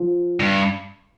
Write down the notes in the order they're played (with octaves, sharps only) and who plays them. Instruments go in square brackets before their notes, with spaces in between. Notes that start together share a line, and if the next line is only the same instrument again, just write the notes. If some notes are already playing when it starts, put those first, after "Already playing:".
Already playing: [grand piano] F3
[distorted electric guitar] G2